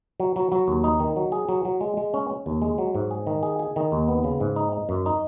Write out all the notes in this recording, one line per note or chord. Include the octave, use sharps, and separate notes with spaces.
F#3
F#3
F#3
D#2
D#4
D#3
F#3
G#4
F#3
F#3
G#3
G#3
C#4
C#4
D#2
G#3
F#3
G#2
G#4
D#3
G#4
G#4
D#3
D#2
B3
C#3
G#2
D#4
D#4
F#2
D#4